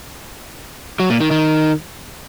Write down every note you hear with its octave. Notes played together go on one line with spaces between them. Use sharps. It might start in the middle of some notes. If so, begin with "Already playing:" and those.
F#3
A#2
D#3
D#3